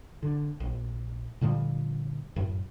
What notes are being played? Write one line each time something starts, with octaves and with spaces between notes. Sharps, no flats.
D3
A#1
A#2 D3 F3 G3
F#2 A2